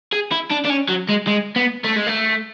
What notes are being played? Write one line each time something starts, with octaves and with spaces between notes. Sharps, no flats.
G#4
E4
D4
D4
C#4
F#3
G#3
G#3
B3
A3
G#3
A3